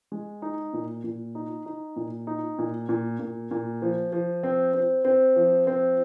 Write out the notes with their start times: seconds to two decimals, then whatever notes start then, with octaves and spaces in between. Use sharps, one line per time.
0.12 G#3
0.42 D#4
0.73 A#2
1.04 A#2
1.35 D#4
1.66 D#4
1.96 A#2
2.27 D#4
2.59 A#2
2.89 A#2
3.19 A#2
3.51 A#2
3.82 F3
4.13 F3
4.43 C4
4.74 C4
5.05 C4
5.36 F3
5.67 C4